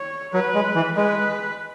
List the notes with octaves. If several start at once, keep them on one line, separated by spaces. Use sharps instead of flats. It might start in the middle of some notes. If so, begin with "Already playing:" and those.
Already playing: C#5
F#3 B4
G#3
E3
G#3 B4